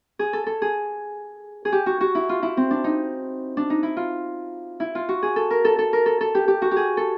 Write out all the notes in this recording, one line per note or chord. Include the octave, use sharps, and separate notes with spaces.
G#4
A4
A4
G#4
G#4
G4
F#4
F#4
E4
F4
E4
C4
D4
D#4
D4
D#4
E4
F4
E4
F4
F#4
G#4
A4
A#4
A4
A4
A#4
A4
A4
G4
G4
F#4
G4
G#4
A4